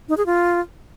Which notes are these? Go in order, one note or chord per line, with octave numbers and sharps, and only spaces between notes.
D#4
G#4
F4